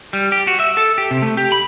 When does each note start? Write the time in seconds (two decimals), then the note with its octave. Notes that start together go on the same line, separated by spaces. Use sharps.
0.13 G3
0.32 G4
0.47 F#4
0.60 E5
0.77 A4
0.98 G4
1.11 C3
1.22 A3
1.37 G4
1.52 B5